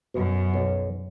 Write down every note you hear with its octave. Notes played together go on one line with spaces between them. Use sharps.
F#2 B2
B1